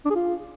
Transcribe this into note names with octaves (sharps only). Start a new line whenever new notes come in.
D4
G#4
F4